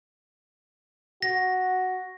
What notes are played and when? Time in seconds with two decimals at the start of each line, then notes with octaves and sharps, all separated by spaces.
1.22 F#4 A#6